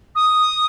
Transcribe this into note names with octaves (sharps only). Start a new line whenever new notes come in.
D#6